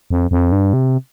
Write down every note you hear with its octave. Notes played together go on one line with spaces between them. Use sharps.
F2
F2
G2
C3